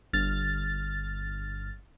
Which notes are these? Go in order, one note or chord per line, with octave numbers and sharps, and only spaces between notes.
G1 F6 A6